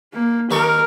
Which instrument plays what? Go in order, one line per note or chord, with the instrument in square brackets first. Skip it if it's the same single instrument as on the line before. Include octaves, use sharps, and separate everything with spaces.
[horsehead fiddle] A#3
[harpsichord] D#2 D#4 C#6 [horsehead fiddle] A#4